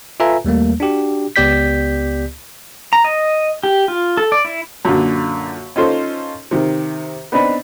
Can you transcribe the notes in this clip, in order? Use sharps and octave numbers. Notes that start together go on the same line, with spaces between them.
F4 A4 B4 E5 G#5 A#5
D#2 G3 A3 A#3
D4 F#4 G4
C#2 B3 G4 D5 G6 B6
A#5
D#5
G4
F4
A4
D5
E4
F#2 A#2 D3
C#4 D#4 F4 A4 C5
C3 D#3
B3 C4 D4 D#4 B4